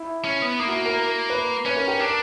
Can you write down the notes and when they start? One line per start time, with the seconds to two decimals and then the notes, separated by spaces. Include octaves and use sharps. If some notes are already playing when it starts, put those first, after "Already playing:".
Already playing: E4
0.24 C#4
0.42 B3
0.59 A#3 E4
0.68 F#4
0.86 A#4
1.30 B4
1.65 C#4 B4
1.77 A#4
1.88 G4
1.99 D4 A#4